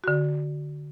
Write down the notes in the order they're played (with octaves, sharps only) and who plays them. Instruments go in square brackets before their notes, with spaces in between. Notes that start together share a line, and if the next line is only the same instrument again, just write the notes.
[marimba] D3 F#4